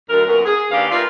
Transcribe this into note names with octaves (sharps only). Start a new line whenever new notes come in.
D2 D3 F#3 A#4
F#2 A#2 B3 F#4 A#4
G#4
D#2 C#4 D4 G4 B4 F5
A3 F4 G4 A#4 B4 D5